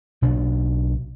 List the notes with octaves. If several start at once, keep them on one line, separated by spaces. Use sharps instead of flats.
B1 B2 D4